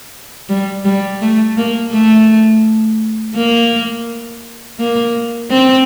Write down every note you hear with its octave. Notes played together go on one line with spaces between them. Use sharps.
G3
G3
A3
A#3
A3
A#3
A#3
C4